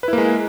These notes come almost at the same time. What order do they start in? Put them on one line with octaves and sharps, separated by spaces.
B4 E4 A#3 G#3